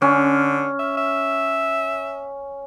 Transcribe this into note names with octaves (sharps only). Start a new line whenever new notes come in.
D3 C#4
E5
E5